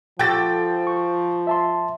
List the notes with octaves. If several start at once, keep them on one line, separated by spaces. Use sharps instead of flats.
F3 F#4 G4 A4 G5 A6
C#6
E5 A5 C6